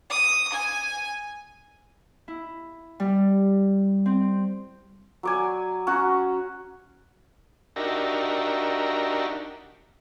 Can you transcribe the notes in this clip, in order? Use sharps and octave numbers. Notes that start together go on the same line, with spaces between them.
D#6
G#5
E4
G3
C4
F#3 D5 G#5
C#4 F#4 F#5 A#5
D4 D#4 F#4 G4 A#4 E5